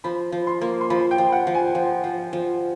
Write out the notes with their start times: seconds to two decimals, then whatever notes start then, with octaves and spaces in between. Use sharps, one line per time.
0.04 F3 B5
0.32 F3
0.47 C6
0.61 A#3
0.81 C6
0.90 F3 B5
1.11 G5
1.18 F3
1.32 F#5
1.47 F3
1.55 G#5
1.75 F3
2.04 F3
2.33 F3